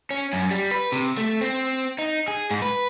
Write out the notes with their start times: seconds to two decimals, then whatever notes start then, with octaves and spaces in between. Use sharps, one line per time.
0.11 C#4
0.33 F#2
0.51 G3
0.71 B4
0.92 C3
1.17 A3
1.41 C4
1.99 D#4
2.28 G#4
2.51 G#2
2.62 B4